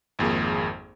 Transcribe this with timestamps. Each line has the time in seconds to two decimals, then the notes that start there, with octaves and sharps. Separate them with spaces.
0.19 G#1 F2 A#3 G#4